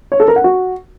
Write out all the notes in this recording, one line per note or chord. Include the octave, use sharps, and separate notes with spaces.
C#5
A4
A#4
F#5
F#4